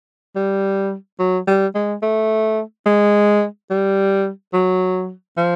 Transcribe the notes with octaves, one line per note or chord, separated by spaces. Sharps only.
G3
F#3
G3
G#3
A3
G#3
G3
F#3
F3